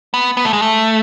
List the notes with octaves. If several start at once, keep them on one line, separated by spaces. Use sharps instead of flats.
B3
B3
A3
G#3
A3